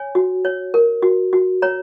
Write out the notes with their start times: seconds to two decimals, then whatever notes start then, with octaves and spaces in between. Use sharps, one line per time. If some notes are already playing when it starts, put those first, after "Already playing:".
Already playing: C#5 G#5
0.15 F#4
0.45 C#5
0.74 A#4
1.02 F#4
1.33 F#4
1.62 C#5 A#5